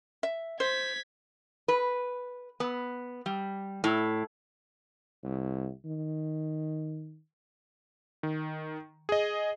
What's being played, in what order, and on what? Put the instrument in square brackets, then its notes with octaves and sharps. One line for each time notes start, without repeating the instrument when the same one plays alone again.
[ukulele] E5
[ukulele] C5 [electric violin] G#6 B6
[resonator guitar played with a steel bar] B4
B3
G3
A2
[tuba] C2
D#3
[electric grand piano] D#3
G#4 D#5